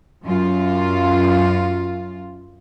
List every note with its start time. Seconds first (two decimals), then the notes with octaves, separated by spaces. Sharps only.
0.24 F#2 F4